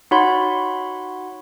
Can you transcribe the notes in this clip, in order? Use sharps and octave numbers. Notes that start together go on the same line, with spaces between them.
D#4 F#4 C#5 F#5 B5 C6